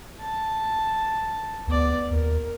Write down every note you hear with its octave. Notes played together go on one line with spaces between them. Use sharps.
A5
D2 B3 D5
D#2 A#4